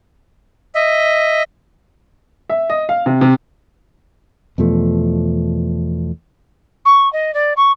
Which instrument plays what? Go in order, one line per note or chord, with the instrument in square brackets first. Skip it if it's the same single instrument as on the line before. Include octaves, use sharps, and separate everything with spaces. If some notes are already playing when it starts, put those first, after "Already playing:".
[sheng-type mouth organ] D#5 E5
[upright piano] E5
D#5
F5
C3
C3
[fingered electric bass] E2 B2 F3 A3
[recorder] C#6
D#5
D5
C#6